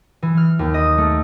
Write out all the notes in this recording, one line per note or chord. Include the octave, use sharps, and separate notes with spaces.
E3
F6
D#2
D#5
A3